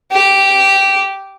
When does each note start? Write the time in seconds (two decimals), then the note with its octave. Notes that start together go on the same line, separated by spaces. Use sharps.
0.12 G4